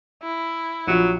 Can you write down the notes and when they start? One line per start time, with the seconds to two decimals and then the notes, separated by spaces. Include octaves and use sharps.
0.23 E4
0.87 A#1 F#3 F#4